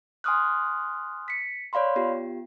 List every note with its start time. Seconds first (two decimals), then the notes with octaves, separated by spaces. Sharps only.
0.24 G#5 C6 D6 D#6 F6 F#6
1.28 B6 C#7
1.73 C#5 D5 F5 B5 C6
1.96 B3 F4 G4